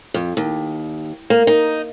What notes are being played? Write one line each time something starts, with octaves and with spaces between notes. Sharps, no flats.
F2
D#2
A#3
D#4